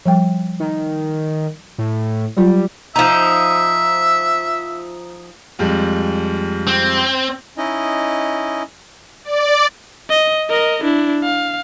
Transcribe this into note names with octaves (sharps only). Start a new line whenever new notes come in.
F3 G3 G5
D#3
A2
F#3 G3 F4
F3 D#4 E5
F2 G3 G#3
C4
C#4 D#4 E4 D#5
D5
D#5
A#4 D#5
D4 E4
F5